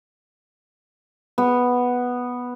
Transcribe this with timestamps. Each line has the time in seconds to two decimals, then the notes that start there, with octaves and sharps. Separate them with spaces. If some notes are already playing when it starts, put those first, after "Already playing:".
1.38 B3